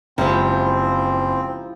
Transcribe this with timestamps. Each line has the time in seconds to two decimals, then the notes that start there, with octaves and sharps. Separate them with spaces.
0.18 F#1 F3 G#3 C4 E4 G4 A#5